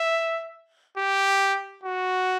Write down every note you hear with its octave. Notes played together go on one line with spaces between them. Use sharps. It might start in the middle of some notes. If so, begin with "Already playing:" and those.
Already playing: E5
G4
F#4